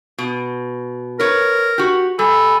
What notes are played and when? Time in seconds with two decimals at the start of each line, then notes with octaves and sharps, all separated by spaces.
0.18 B2
1.20 A#4 B4 C#5
1.78 F#4 G4
2.19 G3 A4 G#5 B5